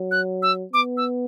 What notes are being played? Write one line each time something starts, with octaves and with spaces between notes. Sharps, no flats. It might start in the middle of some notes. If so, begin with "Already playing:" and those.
Already playing: F#3
F#6
E6
B3 D6
E6